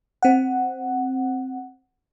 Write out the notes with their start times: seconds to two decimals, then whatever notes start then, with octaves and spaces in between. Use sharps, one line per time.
0.23 C4 F#5